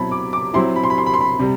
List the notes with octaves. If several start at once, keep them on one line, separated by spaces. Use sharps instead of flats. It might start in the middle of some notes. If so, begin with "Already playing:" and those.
Already playing: B2 F#3 C4 E4 A5 B5
D6
D6
F#3 C4 E4 C6
B5
C6
B5
C6
B5
C6
B5
C3 G3